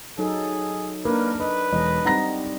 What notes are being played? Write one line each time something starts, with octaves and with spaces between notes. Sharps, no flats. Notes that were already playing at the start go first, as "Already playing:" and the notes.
F#3 D#4 G#4 A4
A#3 D4 A#4 B4
B4 D#5
E1 D#5
G3 C4 D#4 F#5 A#5 A#6